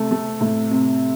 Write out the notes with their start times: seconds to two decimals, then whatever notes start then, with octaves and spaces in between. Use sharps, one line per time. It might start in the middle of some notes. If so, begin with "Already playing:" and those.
Already playing: C3 A3
0.11 A3
0.41 A2
0.71 C3